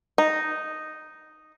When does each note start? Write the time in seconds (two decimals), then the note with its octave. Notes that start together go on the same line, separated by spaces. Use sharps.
0.18 D#4